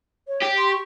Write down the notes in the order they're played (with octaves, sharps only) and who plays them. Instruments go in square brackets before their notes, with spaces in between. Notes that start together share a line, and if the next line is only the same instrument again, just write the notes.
[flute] C#5
[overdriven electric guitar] G4
[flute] C6
C#6